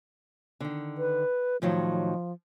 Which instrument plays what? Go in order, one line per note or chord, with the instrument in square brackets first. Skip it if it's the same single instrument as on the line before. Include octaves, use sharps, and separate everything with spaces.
[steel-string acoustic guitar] D3 D#3
[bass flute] B4
[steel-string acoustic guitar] A2 D#3 F#3 [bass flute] F3